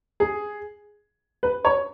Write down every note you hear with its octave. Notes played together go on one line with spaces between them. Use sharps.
G#4
B4
C#5